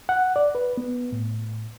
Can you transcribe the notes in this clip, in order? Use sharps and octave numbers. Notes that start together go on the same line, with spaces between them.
F#5
D5
B4
B3
A2